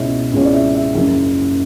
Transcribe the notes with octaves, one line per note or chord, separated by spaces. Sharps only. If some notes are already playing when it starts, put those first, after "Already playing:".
Already playing: C#2 B2 G#3 C#4 E4 E5
C#2 B2 G#3 C#4 E4
D5
E5
E5
F#1 F#2 C#3